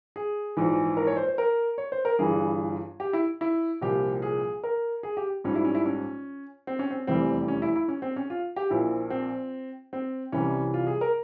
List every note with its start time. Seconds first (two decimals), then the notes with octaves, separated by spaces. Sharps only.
0.16 G#4
0.57 A#1 G#2 E3
0.97 A#4
1.07 C#5
1.17 C5
1.28 C5
1.38 A#4
1.78 C#5
1.92 C5
2.05 A#4
2.19 G1 G2 E3 G3 G#4
3.00 G4
3.13 E4
3.41 E4
3.81 C2 A#2 F3 G4
4.22 G#4
4.64 A#4
5.03 G#4
5.17 G4
5.44 A#1 G#2 G3 C#4
5.55 E4
5.64 C#4
5.75 E4
5.86 C#4
6.67 C4
6.79 C#4
6.91 C4
7.07 F1 E2 E3 G3 C4
7.48 C#4
7.62 E4
7.76 E4
7.88 C#4
8.02 C4
8.16 C#4
8.30 F4
8.56 G4
8.70 A#1 A#2 F3 E4
9.10 C4
9.93 C4
10.32 C2 C3 E3 G3 C#4
10.74 F4
10.87 G#4
11.01 A#4